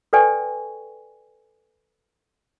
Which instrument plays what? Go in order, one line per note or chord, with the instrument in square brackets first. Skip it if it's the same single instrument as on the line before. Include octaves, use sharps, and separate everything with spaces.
[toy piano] A4 B4 D5 G5 G#5 C#6